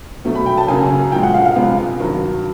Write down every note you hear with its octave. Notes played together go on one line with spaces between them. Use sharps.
B2 F#3 A3
B5
G5
A5
F#2 C#3 F#3 A#3 G#5
A#2 F3 G#3 G5
F#5
F5
F5
C3 F3 G#3 B3 F5
G2 D#3 F#3